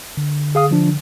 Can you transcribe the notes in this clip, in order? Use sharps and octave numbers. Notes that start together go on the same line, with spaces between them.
D3
G#4 F5 D#6
F3 D4